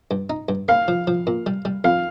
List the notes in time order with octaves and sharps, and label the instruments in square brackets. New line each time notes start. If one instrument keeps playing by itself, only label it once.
[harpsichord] G2
D#4
G2
[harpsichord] A#3 [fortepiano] F5
[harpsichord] F3
F3
A#2
G3
G3
[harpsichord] F2 [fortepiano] F5